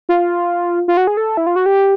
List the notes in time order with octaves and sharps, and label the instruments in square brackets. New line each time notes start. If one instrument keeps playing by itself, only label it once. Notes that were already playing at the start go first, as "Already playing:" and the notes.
[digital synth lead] F4
F4
F#4
G#4
A4
E4
F4
F#4
G4